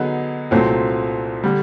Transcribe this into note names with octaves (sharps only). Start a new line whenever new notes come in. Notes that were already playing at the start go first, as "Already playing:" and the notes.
Already playing: D3 F#3 B3 D#4 G#4
C2 A#2 F#3 A3 C4
D3 G3